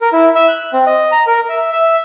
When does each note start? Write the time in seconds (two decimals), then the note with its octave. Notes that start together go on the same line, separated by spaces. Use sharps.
0.01 A#4
0.13 E4
0.35 E5
0.48 F#6
0.73 C4
0.86 D#5
1.12 A#5
1.27 A#4
1.49 E5
1.72 E5